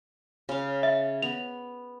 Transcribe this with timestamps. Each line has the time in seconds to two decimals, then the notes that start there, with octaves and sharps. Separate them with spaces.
0.49 C#3 F5
0.83 E5
1.22 B3 F7